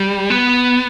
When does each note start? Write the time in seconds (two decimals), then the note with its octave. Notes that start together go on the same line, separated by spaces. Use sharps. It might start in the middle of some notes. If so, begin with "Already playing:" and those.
Already playing: G3
0.30 B3